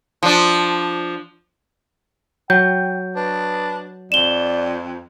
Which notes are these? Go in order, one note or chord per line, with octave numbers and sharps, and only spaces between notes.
F3 D4
F#3 G5 G6
D4 B4
F2 D5 E7 G7